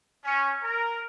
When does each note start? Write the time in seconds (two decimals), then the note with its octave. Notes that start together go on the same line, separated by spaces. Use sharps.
0.25 C#4
0.64 A#4